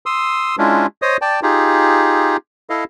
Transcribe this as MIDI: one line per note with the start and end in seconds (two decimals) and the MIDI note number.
0.06 0.56 84
0.06 0.56 87
0.06 0.56 88
0.58 0.87 56
0.58 0.87 61
0.58 0.87 62
0.58 0.87 64
0.58 0.87 65
1.02 1.17 72
1.02 1.17 73
1.02 1.17 75
1.02 1.17 87
1.21 1.40 74
1.21 1.40 79
1.21 1.40 81
1.43 2.37 63
1.43 2.37 65
1.43 2.37 67
1.43 2.37 68
2.70 2.84 64
2.70 2.84 69
2.70 2.84 75
2.70 2.84 77